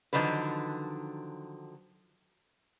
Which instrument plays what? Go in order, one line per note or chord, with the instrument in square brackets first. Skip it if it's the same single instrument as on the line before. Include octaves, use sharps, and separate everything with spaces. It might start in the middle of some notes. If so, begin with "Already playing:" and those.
[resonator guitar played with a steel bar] D3 D#3 F3 F#3 B4